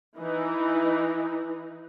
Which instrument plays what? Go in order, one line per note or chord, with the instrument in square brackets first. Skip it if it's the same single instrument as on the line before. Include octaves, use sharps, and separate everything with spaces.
[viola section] E3 D#4